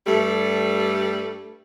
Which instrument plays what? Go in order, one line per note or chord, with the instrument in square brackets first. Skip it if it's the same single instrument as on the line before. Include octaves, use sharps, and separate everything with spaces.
[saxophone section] G2 G3 A3